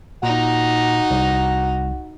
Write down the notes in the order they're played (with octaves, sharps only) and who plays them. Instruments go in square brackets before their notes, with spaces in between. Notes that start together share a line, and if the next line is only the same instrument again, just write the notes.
[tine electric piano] A#2 [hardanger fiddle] D#4 A#5 [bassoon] F#4
[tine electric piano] C2